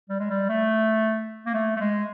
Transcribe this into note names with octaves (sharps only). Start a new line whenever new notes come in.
G3
G#3
G3
A3
A#3
A3
A3
G#3